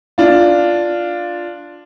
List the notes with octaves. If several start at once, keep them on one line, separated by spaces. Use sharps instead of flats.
D4 F4